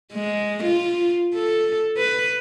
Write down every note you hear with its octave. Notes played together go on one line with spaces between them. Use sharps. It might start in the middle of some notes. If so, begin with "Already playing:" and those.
G#3
F4
A4
B4